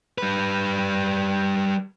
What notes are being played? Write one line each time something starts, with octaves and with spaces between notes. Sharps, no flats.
G3 B4